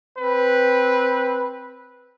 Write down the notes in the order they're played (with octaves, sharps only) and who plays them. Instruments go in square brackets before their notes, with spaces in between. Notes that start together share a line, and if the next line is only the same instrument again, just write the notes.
[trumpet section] C4 B4